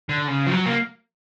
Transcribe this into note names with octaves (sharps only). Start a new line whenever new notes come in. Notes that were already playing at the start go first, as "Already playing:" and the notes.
D3
C#3
F3
F#3
A#3